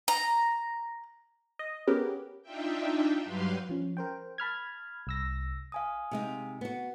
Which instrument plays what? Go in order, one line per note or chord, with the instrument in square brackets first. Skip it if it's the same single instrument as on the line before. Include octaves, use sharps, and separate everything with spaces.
[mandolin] A#5
[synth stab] D#5
B3 C#4 G4 G#4 A#4 B4
[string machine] D4 D#4 F4 E5 G5
G2 F#3 G4 B4 F5 C6
[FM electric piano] F3 C#4
A#4 C5 G5
A5 B5 F6 G#6
C2 E6 A#6
[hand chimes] F5 G#5 D#6
[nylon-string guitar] C3 G#3 D#4
B3 F#4